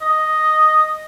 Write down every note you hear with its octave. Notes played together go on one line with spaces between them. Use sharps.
D#5